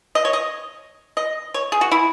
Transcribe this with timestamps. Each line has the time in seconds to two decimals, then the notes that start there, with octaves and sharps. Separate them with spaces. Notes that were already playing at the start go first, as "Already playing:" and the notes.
0.15 D#5
0.25 C#5
0.33 D#5
1.17 D#5
1.54 C#5
1.72 G#4
1.81 F#4
1.91 E4